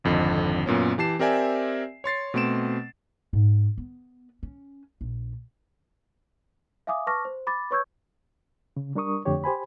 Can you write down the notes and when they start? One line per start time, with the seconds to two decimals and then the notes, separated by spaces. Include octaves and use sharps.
0.04 G#1 F2 D3 D#5
0.66 F#2 A#2 B3 C#4
0.98 E3 G4 A5 C7 E7
1.19 C4 G4 A#4 D5 E5 G#5
2.04 C#5 C6 A6 C7
2.34 B2 A3 C4 C6 D7 E7
3.33 G#2
3.77 B3
4.43 C#4
5.01 A#1
6.87 E5 F5 G#5 D6 D#6
7.07 B4 A5 C#6 D6 F6 A#6
7.25 C5
7.47 B5 D6 A6
7.71 B4 C#5 C#6 E6 G6 G#6
8.77 C#3
8.95 G3 D4 A#4 C#6 D#6
9.25 F2 D3 A3 G4 C#5
9.44 G4 C5 G#5 B5